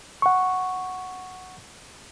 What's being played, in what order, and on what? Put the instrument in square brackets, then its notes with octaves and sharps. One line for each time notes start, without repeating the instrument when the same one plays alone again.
[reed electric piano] F#5 C#6